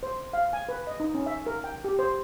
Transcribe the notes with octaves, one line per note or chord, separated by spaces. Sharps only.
C5
F5
G#5
B4
D#5
D#4
C#4
E5
A#4
G5
G4
C5